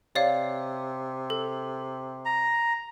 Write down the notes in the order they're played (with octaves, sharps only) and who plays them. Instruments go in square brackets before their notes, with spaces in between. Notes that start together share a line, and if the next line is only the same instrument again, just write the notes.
[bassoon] C3 [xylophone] C#5 D5 F5
[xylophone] A4
[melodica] A#5